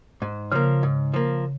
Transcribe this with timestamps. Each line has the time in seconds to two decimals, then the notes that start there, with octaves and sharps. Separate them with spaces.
0.22 G#2
0.52 C#3 F3 A#3
0.83 G#2
1.14 F3 A#3